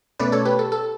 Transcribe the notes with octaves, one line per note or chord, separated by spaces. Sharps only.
B2 A3 C#4 B4 D5
A4 C#5
G4 B4
A4
A4